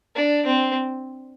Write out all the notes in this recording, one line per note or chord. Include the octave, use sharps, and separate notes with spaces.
D4
C4